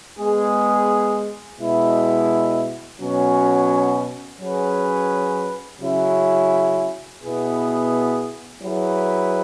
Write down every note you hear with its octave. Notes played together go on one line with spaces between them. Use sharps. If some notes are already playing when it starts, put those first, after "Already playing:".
G#3 B3 G#4
B2 G#3 E4
B2 F#3 C#4
F#3 C#4 G#4 B4
C#3 F#3 C#4 E4
B2 B3 E4 G#4
F#3 E4 G#4 B4